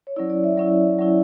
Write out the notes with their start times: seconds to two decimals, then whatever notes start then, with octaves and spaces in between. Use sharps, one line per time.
0.07 C#5
0.16 F#3 C#4 E4 D5
0.30 D5
0.44 E5
0.57 F#3 C#4 E4 D5
0.98 F#3 C#4 E4